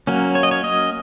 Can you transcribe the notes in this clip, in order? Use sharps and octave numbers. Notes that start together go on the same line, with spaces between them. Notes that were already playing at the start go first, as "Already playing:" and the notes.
F#3 A#3 C#4
C#5
D#5
C#5
D#5